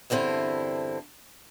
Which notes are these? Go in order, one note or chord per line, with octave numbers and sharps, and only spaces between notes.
E2 G2 D3 C4 E4